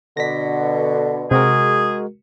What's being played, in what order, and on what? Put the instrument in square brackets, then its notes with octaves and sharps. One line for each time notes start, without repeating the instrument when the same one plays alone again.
[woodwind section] B2 D3 [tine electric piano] A#6 B6
[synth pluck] C3 [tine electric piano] G#3 F#4 A#4 [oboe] G#4